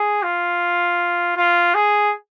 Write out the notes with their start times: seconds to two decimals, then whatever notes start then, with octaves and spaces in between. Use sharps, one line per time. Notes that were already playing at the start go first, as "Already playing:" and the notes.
Already playing: G#4
0.23 F4
1.36 F4
1.74 G#4